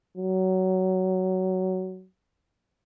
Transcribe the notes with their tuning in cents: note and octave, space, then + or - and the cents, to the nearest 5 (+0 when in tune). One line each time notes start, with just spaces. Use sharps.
F#3 +15